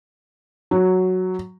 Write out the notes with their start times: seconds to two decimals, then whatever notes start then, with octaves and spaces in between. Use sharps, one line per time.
0.71 F#3